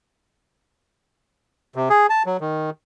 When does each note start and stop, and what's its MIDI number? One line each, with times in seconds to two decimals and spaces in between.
1.76 1.89 48
1.90 2.07 68
2.10 2.23 81
2.26 2.37 54
2.41 2.70 51